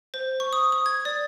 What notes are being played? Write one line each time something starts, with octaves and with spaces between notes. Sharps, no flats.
C5
C#6
D#6
D#6
G#6
D5